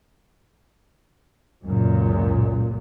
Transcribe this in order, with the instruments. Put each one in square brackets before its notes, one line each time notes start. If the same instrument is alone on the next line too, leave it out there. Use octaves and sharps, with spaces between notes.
[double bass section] C#2 F#2 A#2